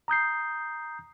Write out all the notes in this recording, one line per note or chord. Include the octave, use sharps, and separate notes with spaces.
A#5 D#6 G6 C7